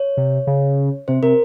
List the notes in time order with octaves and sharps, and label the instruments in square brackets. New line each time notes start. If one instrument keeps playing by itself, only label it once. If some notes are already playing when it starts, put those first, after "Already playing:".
Already playing: [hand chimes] C#5
[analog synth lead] C3
C#3
[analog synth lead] C3 [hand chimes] C5
[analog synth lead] C3 [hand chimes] A#4